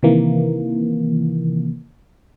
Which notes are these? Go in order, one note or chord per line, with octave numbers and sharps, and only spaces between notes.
C3 D#3 E3 A#3